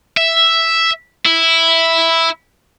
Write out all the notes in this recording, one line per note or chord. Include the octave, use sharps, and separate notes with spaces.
E5
E4